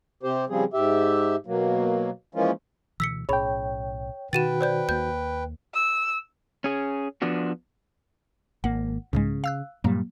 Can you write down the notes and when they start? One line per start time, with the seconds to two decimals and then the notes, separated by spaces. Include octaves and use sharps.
0.23 C3 C4 G4 C5
0.49 C#3 F3 G3 C4 G#4
0.73 G#2 G4 E5
1.46 B2 F#3 A#3
2.35 E3 F3 G#3 A#3 C#4 F4
3.00 D2 B2 E3 E6 B6 C#7
3.29 B1 A2 C#4 G#4 C#5 G5 B5
4.33 B2 D#3 F#4 B4 G5 A6 D#7 E7
4.61 C5 D5 G6
4.89 D#2 A#3 G6
5.74 E6
6.64 C#4 G#4
7.22 F3 B3 D4 F#4
8.64 G#1 A#3 F#5
9.13 C2 G#2 C#3 G#3
9.44 F5 E6 F#6
9.84 G2 A#2 F#3 G3 A#3